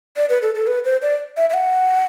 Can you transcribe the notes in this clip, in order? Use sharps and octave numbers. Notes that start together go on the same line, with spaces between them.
D5
B4
A4
A4
B4
C5
D5
E5
E5
F#5